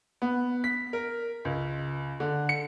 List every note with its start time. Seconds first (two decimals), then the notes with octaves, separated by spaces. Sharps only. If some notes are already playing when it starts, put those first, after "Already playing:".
0.22 B3
0.64 B6
0.93 A#4
1.45 C#2
2.20 D3
2.49 C#7